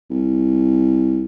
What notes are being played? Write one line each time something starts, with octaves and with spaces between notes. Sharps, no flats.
C2